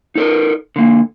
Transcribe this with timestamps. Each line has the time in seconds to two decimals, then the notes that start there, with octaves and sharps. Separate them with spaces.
0.15 D#4 A4 A#4
0.76 D3 A#3